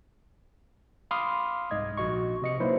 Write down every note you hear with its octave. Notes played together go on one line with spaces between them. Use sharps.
F5 B5 C6 D6 D#6 F6
C2 G#2 D#5 G#6
A#1 F#4 D#5 C#6
C3 D#5 C#7
F#3 A#3 D#4 E4 B4 C5